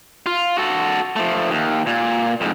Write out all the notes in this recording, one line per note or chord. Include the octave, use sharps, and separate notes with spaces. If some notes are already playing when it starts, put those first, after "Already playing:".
F4
F#4 A4
F3 A3
D#2
A#2
F2 G#2